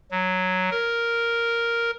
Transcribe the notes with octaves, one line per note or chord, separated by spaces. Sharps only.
F#3
A#4